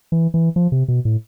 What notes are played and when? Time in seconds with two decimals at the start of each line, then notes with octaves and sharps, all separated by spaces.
0.12 E3
0.34 E3
0.56 F3
0.72 C3
0.88 B2
1.05 A2